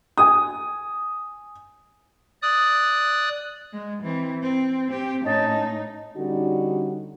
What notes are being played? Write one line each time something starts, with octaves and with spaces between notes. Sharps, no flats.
G#5 D#6
D5 D#6 F#6
G#3
E3 C4
C4
C4 G4
A2 C#4 D#4 D#5 A5
D3 G3 C#4 D#4 F#4